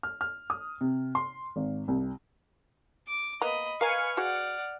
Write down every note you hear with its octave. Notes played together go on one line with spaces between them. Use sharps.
F6
F6
D#6
C3
C6
G#1
C2
D6
A#3 B3 D#5 A#5 B5
A#4 B4 F5 G#5 A#5 C#6 F6 C#7
F#4 G#4 D5 F#5